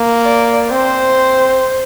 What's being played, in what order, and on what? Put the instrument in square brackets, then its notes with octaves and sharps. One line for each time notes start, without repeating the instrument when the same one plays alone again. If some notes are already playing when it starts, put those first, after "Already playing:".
Already playing: [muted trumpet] A#3
[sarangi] D5
[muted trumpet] C4 [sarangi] C5